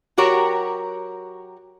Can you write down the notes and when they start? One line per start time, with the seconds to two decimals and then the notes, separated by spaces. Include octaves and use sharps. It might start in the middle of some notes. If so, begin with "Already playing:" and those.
0.17 F#3 F#4 G4 A#4 C#5